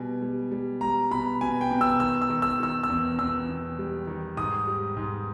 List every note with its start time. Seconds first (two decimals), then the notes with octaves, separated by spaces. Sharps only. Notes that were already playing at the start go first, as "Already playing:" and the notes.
Already playing: B2 G3 G#5
0.22 G3
0.51 G3
0.81 G3 A#5
1.11 B2 B5
1.41 B2 G#5
1.61 G5
1.71 B2
1.81 E6
2.00 D#3 E6
2.21 E6
2.30 D#3
2.42 E6
2.60 D#3 E6
2.83 E6
2.89 E2
3.18 E2 E6
3.49 E2
3.79 G3
4.07 D#3
4.37 G#2 D#6
4.67 G3
4.97 G#2